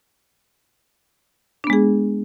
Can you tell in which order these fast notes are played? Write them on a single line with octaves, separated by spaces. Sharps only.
D4 B3 G#3 G#4